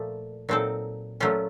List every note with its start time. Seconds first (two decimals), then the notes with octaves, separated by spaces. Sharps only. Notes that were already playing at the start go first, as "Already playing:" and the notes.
Already playing: A#2 F3 A3
0.49 A#2 F#3 C4 D#4 A4
1.20 A#2 F#3 A3 C#4 F4